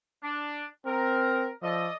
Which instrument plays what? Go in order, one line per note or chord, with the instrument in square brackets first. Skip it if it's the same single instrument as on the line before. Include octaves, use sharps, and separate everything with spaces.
[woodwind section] D4
[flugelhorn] C4 [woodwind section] A#4
[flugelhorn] F3 [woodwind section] A4 D5 D#5